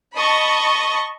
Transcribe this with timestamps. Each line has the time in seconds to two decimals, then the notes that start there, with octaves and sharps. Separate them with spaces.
0.17 D#5 A5 B5 C#6 D#6